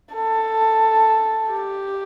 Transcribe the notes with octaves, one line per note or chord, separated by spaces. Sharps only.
A4
G4